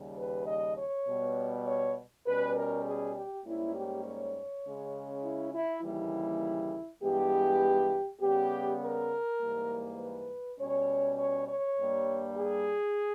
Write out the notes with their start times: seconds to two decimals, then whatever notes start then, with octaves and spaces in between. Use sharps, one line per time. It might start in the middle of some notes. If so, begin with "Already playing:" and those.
Already playing: D#2 C#3 G3
0.18 B4
0.47 D#5
0.78 C#5
1.07 B2 G3 B3
1.66 C#5
2.26 B2 G3 C#4 B4
2.56 A#4
2.85 G#4
3.15 G4
3.45 G#2 G3 A#3 C#4 E4
3.74 G4
4.04 C#5
4.65 C#3 G#3 C#4
5.24 E4
5.54 E4
5.82 D#2 C#3 E3 G3 A#3 E4
7.02 G2 E3 G#3 B3 G4
8.21 C#3 G3 B3 G4
8.81 A#4
9.40 G#2 E3 G3 A#3
9.99 B4
10.59 B2 G3 C#4 C#5
11.18 C#5
11.48 C#5
11.78 G2 G3 A#3
12.38 G#4